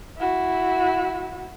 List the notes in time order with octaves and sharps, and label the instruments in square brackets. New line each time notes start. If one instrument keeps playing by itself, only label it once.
[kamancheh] E4 F#4